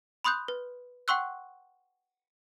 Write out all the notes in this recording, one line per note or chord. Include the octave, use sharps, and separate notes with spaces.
B5 C6 D#6 F#6 G6
B4
F#5 G5 C6 C#6 E6 F#6